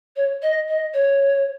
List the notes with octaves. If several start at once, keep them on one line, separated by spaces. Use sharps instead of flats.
C#5
D#5
D#5
C#5